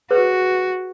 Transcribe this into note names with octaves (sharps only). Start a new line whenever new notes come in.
F#4 G#4 B4 C#5